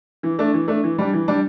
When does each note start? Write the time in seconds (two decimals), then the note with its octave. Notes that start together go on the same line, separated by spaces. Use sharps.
0.23 E3
0.39 A3 D4
0.54 E3
0.68 A3 D4
0.84 E3
0.98 G3 D4
1.13 E3
1.28 G3 D4